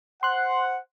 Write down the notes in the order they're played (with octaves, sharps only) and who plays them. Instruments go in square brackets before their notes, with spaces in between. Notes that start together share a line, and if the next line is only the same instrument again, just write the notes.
[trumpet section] C5 F#5 [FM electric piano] C6 F#6